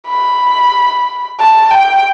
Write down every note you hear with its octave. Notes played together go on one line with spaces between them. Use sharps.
B5
A5
G5